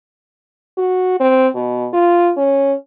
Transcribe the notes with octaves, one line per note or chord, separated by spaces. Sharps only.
F#4
C4
B2
F4
C#4